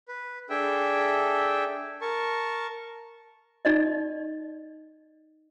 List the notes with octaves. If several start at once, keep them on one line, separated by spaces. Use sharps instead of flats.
B4
D4 G#4 A4 E5 G5
A#4 A5 C#6
D#4 D5 D#5